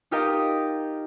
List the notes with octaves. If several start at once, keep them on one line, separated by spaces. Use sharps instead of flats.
D#4 F4 G4 A#4 D#5